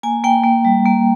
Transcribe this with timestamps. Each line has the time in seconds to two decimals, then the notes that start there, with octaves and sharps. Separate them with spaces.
0.03 A#3 G#5
0.24 A#3 G5
0.44 A#3
0.65 G3
0.86 A#3